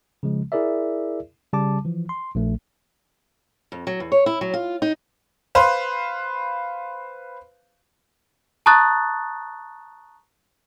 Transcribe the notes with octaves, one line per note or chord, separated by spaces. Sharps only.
C#3 F3 G#3
E4 G#4 A#4 D5 E5
C#3 G3 A5 D6
E3 F3
C6
A#1 A3
F2
F#3
E2
C#5
E4
F#3
F4
D#4
B4 C5 F5
A5 A#5 C#6 D#6 F#6 A6